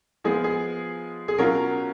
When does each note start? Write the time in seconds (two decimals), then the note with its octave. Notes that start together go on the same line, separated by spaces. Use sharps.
0.24 F3 G#3 B3 F4 G#4
0.44 G#4
1.28 G#4
1.38 B2 F#3 C#4 F4 A#4